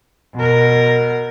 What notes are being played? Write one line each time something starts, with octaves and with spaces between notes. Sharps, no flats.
B2 A#4